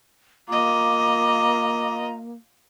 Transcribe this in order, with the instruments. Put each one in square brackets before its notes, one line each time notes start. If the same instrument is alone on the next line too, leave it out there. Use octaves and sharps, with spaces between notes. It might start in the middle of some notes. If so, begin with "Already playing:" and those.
[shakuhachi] A#3 [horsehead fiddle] F4 D#5 [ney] A#5 [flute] D6